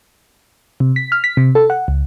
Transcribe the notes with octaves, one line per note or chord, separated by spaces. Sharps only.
C3
B6
F6
B6
C3
A4
F#5
C#2